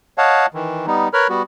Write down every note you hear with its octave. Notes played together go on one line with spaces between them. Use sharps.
C#5 D#5 F5 F#5 A5
D#3 E3
G3 B3 D#4
A#4 B4 C#5 B5 F6
G3 B3 F#4